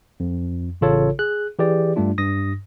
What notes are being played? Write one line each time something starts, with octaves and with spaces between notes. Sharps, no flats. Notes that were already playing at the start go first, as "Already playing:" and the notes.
F2
A1 C#3 F4 A4 C#5
G#4 F#6
E3 G4 G#4 D5
G2 G3 A3 D4 F4
G2 D#6 A#6